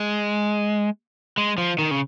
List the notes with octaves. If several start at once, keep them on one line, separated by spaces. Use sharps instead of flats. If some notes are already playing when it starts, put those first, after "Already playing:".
Already playing: G#3
G#3
F3
D#3
C#3